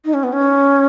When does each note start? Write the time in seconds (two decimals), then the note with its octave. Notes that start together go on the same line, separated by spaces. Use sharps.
0.05 D#4
0.14 C#4
0.24 B3
0.33 C#4